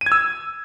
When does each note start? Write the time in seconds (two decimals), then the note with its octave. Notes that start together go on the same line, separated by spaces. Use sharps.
0.01 D#7
0.06 G#6
0.12 E6